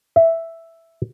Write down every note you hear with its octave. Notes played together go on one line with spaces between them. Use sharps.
E5